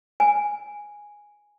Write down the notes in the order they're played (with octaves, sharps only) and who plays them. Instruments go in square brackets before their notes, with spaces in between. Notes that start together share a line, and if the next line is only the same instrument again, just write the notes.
[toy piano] G#5